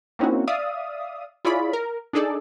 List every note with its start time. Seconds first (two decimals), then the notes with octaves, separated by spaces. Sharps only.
0.19 A#3 C4 C#4 D#4 E4 F#4
0.47 D5 E5 F5 D#6
1.45 E4 F4 G#4 C#5 D5 B5
1.73 A#4
2.13 D4 D#4 G#4 A4 D5